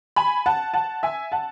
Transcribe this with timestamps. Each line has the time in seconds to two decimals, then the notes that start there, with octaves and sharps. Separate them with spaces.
0.16 G#5 B5
0.46 F#5 A5
0.74 F#5 A5
1.03 E5 G#5
1.32 F#5 A5